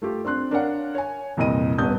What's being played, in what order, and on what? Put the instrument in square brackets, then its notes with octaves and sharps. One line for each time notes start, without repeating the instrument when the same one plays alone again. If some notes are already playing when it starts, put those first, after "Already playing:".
[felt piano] A3 F4 G4
C4 D4 C6 F#6
D4 A#4 C#5 D5 F5 F#5
C#5 G#5
C2 F2 A#2 E3 D#5 D#7
D#1 A1 G3 B3 D#6 G6